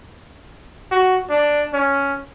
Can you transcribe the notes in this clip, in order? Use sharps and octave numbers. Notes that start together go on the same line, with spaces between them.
F#4
D4
C#4